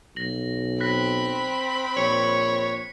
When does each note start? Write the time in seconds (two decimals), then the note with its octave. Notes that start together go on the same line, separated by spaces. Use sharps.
0.16 B1 A#6 F#7
0.80 C4 B5 F#6 A#6 B6
1.97 A#1 C#5 C#7